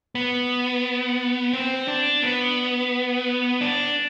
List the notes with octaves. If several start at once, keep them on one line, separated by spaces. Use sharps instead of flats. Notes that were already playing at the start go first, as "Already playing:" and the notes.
B3
C4
D4
B3
D4